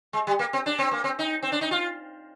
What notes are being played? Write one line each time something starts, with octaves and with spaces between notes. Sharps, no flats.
G#3
G3
A#3
C4
D4
C4
A#3
C4
D#4
C4
D4
D#4
F4